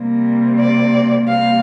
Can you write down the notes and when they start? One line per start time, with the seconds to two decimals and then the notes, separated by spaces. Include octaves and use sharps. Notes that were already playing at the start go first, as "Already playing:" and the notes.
Already playing: C3 G3 A#3
0.58 D5
1.27 C3 G3 A#3 F5